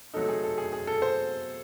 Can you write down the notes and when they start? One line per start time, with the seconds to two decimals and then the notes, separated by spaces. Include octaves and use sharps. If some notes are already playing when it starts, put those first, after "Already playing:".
0.14 C3 F#3 A3 D#4 A4
0.29 G#4
0.44 A4
0.58 G#4
0.73 G#4
0.87 A4
1.02 C5